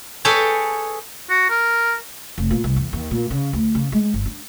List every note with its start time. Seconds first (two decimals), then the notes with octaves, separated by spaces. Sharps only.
0.25 G#4 A4 B4 C#5 G5 A5
1.30 F#4
1.50 A#4
2.38 F1
2.51 A#2
2.64 C2
2.76 E2
2.93 D#2
3.11 A#2
3.30 C#3
3.53 D2
3.75 C#3
3.92 G#3
4.14 G1
4.25 D4